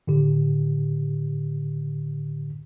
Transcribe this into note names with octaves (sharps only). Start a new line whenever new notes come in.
A2 D3 G4